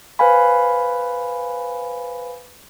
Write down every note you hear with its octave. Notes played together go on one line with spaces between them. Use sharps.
B4 C5 F5 G#5 B5